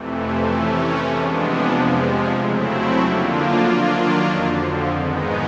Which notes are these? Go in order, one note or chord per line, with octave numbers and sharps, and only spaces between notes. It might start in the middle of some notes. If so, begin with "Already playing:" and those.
Already playing: F2 C3 E3 A3
C3 E3 A3 C#4
C3 F3 G#3 B3 D4
F2 C3 F3 G#3
C#3 F#3 A3 C4 E4
D3 F3 A#3 D4 F4
D#3 F#3 A#3 D4 F4
F2 D3 F3
G#2 D#3 G#3 B3 D#4